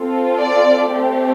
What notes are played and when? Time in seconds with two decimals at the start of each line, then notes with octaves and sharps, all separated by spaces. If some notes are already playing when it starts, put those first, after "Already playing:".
Already playing: C4 F4 A4
0.39 D5
0.91 A3 C4 G4